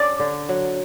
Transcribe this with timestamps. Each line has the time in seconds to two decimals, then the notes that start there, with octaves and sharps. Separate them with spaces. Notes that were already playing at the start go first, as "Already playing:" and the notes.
Already playing: C#4 D5
0.19 D3
0.49 F#3